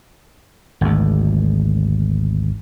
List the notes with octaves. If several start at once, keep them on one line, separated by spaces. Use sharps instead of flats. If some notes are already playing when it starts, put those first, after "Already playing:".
G#1 D2